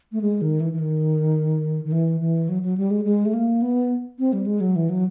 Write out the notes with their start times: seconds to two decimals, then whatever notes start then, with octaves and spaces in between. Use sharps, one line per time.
0.12 A3
0.21 G#3
0.42 D#3
0.60 E3
0.73 E3
0.79 D#3
1.84 D#3
1.92 E3
2.20 E3
2.49 F#3
2.63 F#3
2.78 G3
2.91 G#3
3.05 G#3
3.26 A3
3.34 A#3
3.62 B3
4.19 C4
4.33 G3
4.46 G#3
4.61 F#3
4.76 E3
4.90 F#3